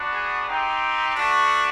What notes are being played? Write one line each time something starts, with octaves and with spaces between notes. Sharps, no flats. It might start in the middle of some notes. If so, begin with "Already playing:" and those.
Already playing: B3 D4 F#4
G#4
C4 D#4 G4
A3 D4 F#4